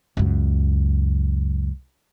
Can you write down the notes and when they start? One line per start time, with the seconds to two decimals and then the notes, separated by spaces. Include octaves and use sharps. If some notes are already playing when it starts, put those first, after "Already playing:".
0.17 C#2 F#2